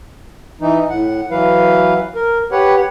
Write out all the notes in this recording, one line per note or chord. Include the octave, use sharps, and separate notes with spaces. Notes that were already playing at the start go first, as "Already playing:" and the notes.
E3 D#4
A2 F#5
E3 F#3 B4 F5
A#4
G4 B4 C#5 F#5